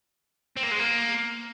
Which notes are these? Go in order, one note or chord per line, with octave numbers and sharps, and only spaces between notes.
C4
A#3
G#3
A#3